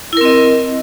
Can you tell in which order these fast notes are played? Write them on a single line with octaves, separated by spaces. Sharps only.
E4 A#4 C4 D#5